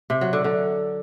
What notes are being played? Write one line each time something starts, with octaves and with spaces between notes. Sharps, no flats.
C3
F#3
D3
D3